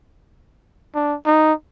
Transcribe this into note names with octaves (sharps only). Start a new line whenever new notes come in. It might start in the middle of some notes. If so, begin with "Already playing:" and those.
D4
D#4